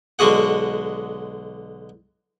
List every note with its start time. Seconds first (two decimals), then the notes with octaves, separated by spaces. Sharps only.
0.19 B1 D3 G#3 F#4 G#4 F#5